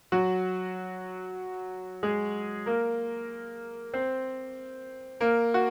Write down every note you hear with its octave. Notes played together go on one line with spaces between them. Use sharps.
F#3 F#4
G#3 G#4
A#3 A#4
C4 C5
A#3 A#4
F#4